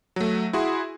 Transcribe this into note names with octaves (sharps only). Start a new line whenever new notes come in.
F#3 A3
E4 F#4 G#4 C6